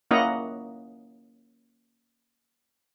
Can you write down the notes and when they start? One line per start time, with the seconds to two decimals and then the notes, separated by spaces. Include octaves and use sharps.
0.11 A#3 C#4 E4 D#5 F#5 A#5